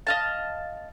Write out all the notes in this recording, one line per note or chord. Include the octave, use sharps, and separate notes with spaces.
D#5 F5 A5